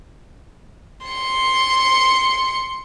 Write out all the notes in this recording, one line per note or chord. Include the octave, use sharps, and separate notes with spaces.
C6 C#7